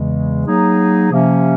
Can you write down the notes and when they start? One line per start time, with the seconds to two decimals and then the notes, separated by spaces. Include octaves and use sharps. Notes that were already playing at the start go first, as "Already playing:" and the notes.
Already playing: E2 C#3 E3 G#3
0.46 F#3 A#3 D#4 G#4
1.11 C3 F3 A#3 C#4